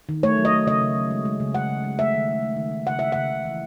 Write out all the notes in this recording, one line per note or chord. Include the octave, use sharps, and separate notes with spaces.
D#3
A3 C#5
F#3
D#5
A3
C#3 D#5
C#3
F#3
G#3
G#3
C#3
C#3 F#5
C#3
G#3
A3 E5
D#3
A3
A3
D#3
D#3
C#3 F#5
C#3 E5
C#3 F#5
C#3
E3